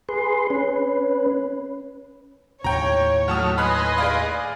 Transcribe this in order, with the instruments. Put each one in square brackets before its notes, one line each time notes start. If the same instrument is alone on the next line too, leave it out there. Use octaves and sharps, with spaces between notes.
[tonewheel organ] G#4 B4 C6
C#4 B4
[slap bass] D#2 A2 [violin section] C#5 [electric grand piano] G5 A#5
[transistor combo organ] F#3 A3 F6 [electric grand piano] F#5 A5 D#6
[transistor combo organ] B4 G#5 C6 [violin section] D#5 [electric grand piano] B5 D#6 F#6
[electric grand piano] G#4 D5 F5